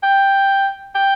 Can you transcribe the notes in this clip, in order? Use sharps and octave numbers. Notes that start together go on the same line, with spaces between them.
G5
G5